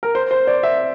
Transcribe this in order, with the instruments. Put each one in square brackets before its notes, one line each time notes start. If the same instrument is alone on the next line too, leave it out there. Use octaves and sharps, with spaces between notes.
[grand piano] A#4
C5
C5
D5
E5